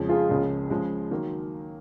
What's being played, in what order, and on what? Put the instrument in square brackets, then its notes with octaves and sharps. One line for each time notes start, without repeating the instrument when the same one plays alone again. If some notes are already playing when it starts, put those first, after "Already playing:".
Already playing: [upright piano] F2 C#3 F3 G#3
[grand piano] F4 G#4
[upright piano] C#2 C#3 F3 A#3
C#3 F3 G#3
D#3 F#3 A#3